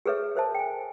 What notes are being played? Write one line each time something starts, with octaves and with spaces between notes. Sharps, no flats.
G#4 A4 B4 C#5 E5
A#4 C5 E5 A5
G5 G#5